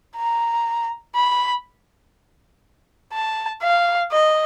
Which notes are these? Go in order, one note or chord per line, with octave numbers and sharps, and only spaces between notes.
A#5
B5
A5
F5
D#5